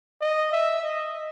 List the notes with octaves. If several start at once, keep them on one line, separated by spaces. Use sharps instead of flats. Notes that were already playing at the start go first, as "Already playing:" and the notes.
D#5
E5
D#5